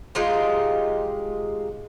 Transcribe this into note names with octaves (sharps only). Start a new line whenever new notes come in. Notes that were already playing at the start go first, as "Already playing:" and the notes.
G#3 D#4 F4 G4